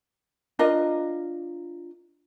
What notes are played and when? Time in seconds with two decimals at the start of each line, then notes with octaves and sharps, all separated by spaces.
0.59 D4 F4 A#4 D#5